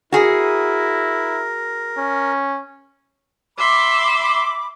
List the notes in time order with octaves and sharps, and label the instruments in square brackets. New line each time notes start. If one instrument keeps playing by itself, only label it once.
[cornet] E4 [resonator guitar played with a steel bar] F#4 G#4 [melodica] A#4
[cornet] C#4
[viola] E5 C6 [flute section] B5 D6